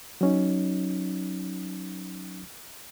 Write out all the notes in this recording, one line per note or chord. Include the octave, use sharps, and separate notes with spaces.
F#3 C#4 D#4